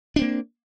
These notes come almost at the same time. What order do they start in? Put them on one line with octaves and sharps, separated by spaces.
D4 C4 A#3